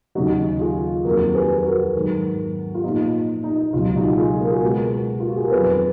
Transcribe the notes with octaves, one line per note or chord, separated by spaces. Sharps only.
D#2 C#3 F#3 D#4 F#4
F4 G#4
F2 D#3 F#3 A#3 F#4 A#4
G#4 B4
F#4 A#4
G#2 D#3 F#3
F4
A#2 F3 B3 D#4
D#4
C#2 B2 F#3 F4
D#4 F#4
F4 G#4
A#4
G#4
F#4 A#4
B2 G#3 B3
F4
F#4
G#4
A#4
F2 D#3 F#3 B3 G#4 B4